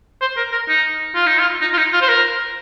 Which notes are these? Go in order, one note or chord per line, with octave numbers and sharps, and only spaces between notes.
C5
A#4
A#4
D#4
F4
D#4
F4
D#4
F4
D#4
F4
C5
A#4